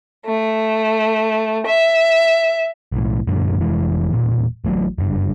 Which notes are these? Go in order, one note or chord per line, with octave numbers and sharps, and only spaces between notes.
A3
E5
B1 A2
F#2 A#2 D3
F1 F2 E3 G#3
E1 A#2
A1 A2 C#3 F#3
F#1 G2